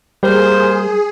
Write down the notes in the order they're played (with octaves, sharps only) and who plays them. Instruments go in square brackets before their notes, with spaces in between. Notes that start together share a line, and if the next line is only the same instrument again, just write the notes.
[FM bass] G3 [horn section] A#3 A#4 C5 [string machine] G#4